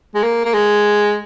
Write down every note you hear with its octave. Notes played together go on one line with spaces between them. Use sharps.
G#3
A#3
A#3
G#3